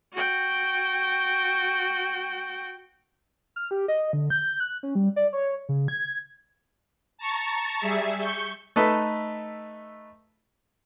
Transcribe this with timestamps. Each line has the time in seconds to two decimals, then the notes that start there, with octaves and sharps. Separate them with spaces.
0.13 F#4 G5
3.56 F6
3.71 G4
3.88 D#5
4.13 D3
4.30 G6
4.60 F#6
4.83 C#4
4.95 G3
5.16 D5
5.33 C#5
5.69 C#3
5.88 G#6
7.18 A5 A#5 C#6 A6
7.79 G3 G#4 E5
8.19 C#6 G6
8.76 A3 D#4 A4 B4 E5